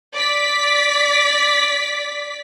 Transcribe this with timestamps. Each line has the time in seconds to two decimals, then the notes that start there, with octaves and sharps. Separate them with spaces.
0.14 D5 B6